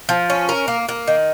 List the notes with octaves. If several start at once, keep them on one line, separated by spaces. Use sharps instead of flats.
F3
C#4
A#4
A#3
A#3
D#3